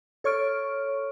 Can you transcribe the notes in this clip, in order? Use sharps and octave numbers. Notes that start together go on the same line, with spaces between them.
A4 C#5 C#6 F6 D7